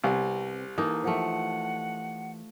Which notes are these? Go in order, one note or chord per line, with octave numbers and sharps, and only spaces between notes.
C2 C3 B3 C4
E3 A#3 D#4 A4
F3 A3 F#5